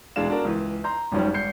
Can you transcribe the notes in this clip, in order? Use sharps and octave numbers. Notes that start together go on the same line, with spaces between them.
E1 E3 G#3 D4 F5 E7
D4 F#4 A#4
C#2 E3
A#5 C6 G6
G#1 F#2 D#3 F3 G3 C#4
G#1 G6 C7 C#7